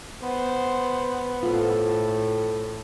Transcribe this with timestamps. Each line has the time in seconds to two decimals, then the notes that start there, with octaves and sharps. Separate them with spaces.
0.22 B3 C5
1.43 A2 F4 A4 C5